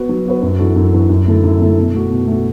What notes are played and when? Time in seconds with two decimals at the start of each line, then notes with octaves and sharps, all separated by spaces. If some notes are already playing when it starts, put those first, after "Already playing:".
Already playing: B3 F#4 B4
0.09 F#3
0.25 B3 F#4 B4
0.42 F#2
0.59 E3 D4 F#4 A4
0.76 F#2
0.93 E3 D4 F#4 A4
1.09 F#2
1.27 D3 A3 E4 A4
1.43 F#2
1.60 D3 A3 E4 A4
1.77 B2
1.94 A3 F#4
2.11 B2
2.27 A3 F#4